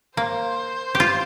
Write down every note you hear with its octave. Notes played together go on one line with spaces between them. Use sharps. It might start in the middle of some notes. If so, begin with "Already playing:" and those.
A#3 C5
G4
F4